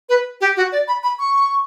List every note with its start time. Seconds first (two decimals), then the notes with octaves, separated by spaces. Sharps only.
0.09 B4
0.41 G4
0.57 F#4
0.72 D5
0.88 B5
1.03 B5
1.19 C#6